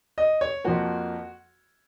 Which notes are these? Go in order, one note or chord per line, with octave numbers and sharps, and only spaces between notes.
D#5
C#5
F2 F3 A#3 F#4